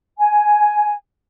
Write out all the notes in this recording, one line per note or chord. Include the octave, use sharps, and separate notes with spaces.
G#5